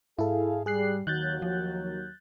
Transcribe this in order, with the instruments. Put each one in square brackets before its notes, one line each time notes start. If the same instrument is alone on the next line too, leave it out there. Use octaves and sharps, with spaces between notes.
[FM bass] G#2 [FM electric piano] E4 A4 [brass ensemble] G#4 F5
[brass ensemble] G3 [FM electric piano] G#4 F#6 C7
[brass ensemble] D#2 F#3 [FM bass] D#3 [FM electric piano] F#6 G6 A6
[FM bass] F3